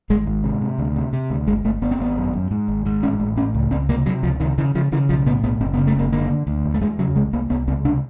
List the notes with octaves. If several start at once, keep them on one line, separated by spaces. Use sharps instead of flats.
G#1 G#3
G#2
C3
C3
D2
C3
C3
D2
G1 G#3
G1 A3
G1 B3
C4
G#1 B3
F#2
F#2
G#2
G#1
G#2
A1 C#4
A1
A2 C#4
C#2
C#2 C4
C3 A#3
C3 F#3
C#2 F3
C3 D#3
C#3 E3
C#3 F3
C#3 E3
B1 F3
A2 B3
B1 B3
F#1 C4
B3
C#3
A3
F#1 A#3
D3 A#3
D3
D2
E2
A3
E2 G#3
C#3 F#3
C2 G#3
C2 A#3
C2 B3
C#2 C4
C3 D4